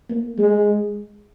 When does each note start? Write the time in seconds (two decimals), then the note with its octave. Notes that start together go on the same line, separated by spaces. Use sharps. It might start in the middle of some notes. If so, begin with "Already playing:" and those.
0.10 A#3
0.38 G#3